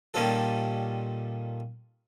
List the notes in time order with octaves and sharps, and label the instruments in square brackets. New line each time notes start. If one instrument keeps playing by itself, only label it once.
[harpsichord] A#2 D#3 G3 C#4 F4 A4